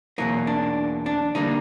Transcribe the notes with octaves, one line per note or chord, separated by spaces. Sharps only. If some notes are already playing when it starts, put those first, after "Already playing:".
E2 B2 F#3 A#3 D#4
D4
D4
D3 G3 A#3 D#4